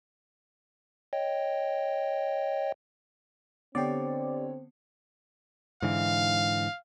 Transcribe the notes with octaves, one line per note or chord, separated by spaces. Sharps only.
C#5 D#5 G5
D3 B3 C4 G4 C#5 D5 C7
G#2 D3 E3 F5